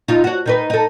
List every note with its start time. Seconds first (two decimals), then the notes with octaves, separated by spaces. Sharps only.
0.08 D#4 F4
0.24 F#4 C#5
0.46 D#3 D#4 B4
0.70 D#4 A4